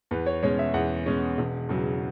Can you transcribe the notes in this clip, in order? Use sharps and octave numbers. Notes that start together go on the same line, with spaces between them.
E2 B4
C#5
B2 G#3 C#4 C#5
E5
E2 F#5
B2 G#3 C#4
E1
E2 C#3 F#3